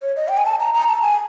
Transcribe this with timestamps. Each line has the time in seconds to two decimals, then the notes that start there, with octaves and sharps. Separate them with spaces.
0.02 C#5
0.16 D#5
0.28 G5
0.37 G#5
0.45 A5
0.60 A#5
0.74 A#5
0.88 A5
1.02 G#5